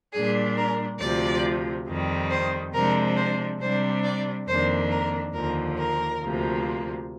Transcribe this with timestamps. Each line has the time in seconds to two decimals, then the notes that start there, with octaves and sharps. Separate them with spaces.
0.13 A#2 G3 D4 G#4
0.57 A#4
1.00 D2 C3 F3 D5
1.88 F2 D#3 G3
2.30 C5
2.74 C3 F3 G#3 D4 A#4
3.17 C5
3.61 C3 G3 D4 C5
4.04 D5
4.48 F2 D#3 A#3 D4 C5
4.91 A#4
5.34 D#2 D3 F3 A#4
5.78 A#4
6.21 D2 C3 F3 A#3